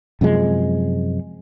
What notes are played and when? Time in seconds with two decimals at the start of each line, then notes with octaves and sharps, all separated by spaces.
0.21 F#2 C3 F3 G#3